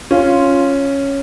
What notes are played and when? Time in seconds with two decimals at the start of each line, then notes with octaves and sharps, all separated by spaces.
0.11 C#4 F4